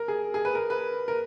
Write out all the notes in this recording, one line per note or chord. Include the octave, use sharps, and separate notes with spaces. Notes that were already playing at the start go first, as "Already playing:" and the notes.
Already playing: A#4
G#4
G#4
B4
A#4
B4
A#4